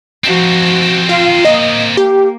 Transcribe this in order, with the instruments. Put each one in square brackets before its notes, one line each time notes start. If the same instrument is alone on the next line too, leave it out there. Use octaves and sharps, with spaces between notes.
[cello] F3 F#4 [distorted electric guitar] C4 D#4
[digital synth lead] F4 [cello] F5
[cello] A#3 [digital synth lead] D#5
[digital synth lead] G4